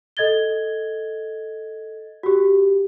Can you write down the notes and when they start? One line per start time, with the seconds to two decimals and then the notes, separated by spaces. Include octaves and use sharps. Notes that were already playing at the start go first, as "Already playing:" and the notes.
0.17 A4 D#5 G#6 A6 G7
2.23 F#4 G4